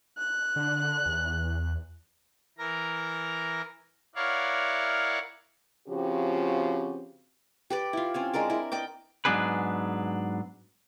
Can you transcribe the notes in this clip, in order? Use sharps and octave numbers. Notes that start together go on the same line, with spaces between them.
F#6
D3
E2
E3 A#4 A#5
E4 A#4 C#5 D5 F5 F#5
C#3 F3 C4 F#4 G4
G4 B4 D5
E4 F4
C4 C#4 C#5
G#3 D4 A#4 D5
E4 A#4
D5 D#5 G5 D6
G#2 F#3 B3 D4 G#4 B4